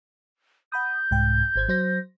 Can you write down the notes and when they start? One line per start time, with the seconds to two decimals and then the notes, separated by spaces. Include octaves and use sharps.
0.72 F#5 B5 D#6 G6
1.11 C2 G#2 G5
1.56 G#1 C5 G#6
1.68 F#3 C5 A#6